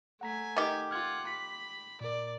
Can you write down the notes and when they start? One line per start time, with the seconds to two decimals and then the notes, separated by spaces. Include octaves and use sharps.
0.21 A3 F#5 G#5 A#5 B6
0.56 D#3 G4
0.91 F4 F#5 F6 G#6
1.27 B5 B6
2.01 A#2 A#4 D5